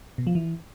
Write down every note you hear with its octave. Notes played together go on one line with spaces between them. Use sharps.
B2
F3
E3